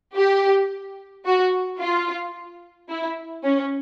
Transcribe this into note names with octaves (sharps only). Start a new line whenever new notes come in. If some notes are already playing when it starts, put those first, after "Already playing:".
G4
F#4
F4
E4
C#4